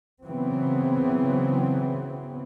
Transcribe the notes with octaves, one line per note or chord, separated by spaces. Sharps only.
C#3 E3 F#3 B3 C4